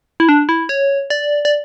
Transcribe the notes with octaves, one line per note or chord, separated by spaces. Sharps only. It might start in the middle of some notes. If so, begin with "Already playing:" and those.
E4
D4
E4
C#5
D5
D5